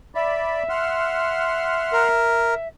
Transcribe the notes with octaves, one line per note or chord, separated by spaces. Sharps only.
D5 E5 B5
F#5 C6 F6
A#4